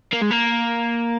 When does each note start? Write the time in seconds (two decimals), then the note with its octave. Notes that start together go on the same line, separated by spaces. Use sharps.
0.13 A#3
0.22 G#3
0.31 A#3